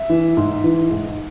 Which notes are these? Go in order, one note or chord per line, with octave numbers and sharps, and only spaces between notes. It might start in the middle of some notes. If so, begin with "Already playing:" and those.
Already playing: E5
E3
G#2
E3
G#2